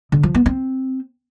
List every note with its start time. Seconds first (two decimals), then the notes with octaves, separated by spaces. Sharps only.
0.12 D3
0.23 F3
0.35 B3
0.46 C4